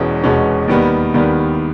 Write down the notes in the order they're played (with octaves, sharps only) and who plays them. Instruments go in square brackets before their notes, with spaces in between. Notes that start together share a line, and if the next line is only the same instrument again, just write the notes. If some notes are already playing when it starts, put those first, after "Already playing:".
Already playing: [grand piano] E1 E2 B2 G#3 C#4
E1 E2 B2 G#3 C#4
D#2 D#3 G3 B3
D#2 D#3 G3 B3